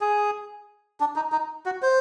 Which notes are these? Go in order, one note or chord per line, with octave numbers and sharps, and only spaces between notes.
G#4
D4
D#4
D#4
F#4
C5